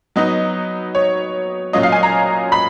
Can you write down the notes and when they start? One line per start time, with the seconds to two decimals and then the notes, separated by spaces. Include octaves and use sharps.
0.16 F#3 B3 D#4 D#5
0.95 C#5
1.73 A#2 F#3 C#4 F4 D#5
1.83 F5
1.92 G#5
2.03 A#5
2.52 B5